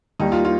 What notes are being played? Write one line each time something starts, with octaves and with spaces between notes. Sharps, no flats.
D#2 D#3 G3 D#4
F4
F4